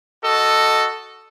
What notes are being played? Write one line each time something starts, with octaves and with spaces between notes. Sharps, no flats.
F#4 A4 D#5